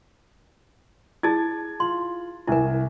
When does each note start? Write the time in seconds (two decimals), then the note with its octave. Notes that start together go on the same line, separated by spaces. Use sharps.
1.23 E4 G#4 A5 G#6 A6
1.80 F4 C6
2.47 C2 E4 A#4 G#5